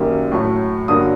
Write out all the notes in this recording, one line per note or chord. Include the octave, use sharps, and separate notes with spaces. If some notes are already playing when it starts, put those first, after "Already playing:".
Already playing: F#2 D#3 G3 A#3
A2 F#3 A3
G2 D3 F#3 A#3 D#6